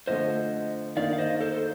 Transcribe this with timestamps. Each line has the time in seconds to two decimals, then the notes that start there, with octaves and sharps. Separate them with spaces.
0.07 D3 F3 A3 C5 D#5
0.96 D#3 A#3 D#4 D5 F5
1.13 F5
1.18 C5 D#5
1.41 A4 C5
1.52 C5